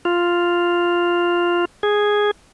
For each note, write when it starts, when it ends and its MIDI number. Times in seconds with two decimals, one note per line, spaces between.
0.05 1.65 65
1.83 2.31 68